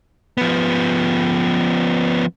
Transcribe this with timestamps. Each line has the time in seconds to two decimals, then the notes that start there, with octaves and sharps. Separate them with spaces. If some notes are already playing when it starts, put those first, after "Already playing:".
0.38 F3 B3